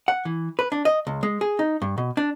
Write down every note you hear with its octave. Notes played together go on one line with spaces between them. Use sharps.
F#5
E3
B4
D4
D#5
C#2
G#3
G#4
D#4
G2
B2
D4